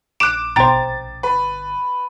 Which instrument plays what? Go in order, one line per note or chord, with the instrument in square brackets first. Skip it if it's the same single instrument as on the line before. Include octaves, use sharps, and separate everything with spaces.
[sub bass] A#1 [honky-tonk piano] D6 E7 [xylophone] F#6 D7
[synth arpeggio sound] G#1 B2 C5 [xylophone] G5 A#5 [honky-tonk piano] A6
[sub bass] G1 [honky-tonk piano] B4